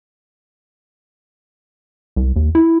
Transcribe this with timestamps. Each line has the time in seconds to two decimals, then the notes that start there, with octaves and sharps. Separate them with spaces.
2.16 C2
2.36 D#2
2.55 E4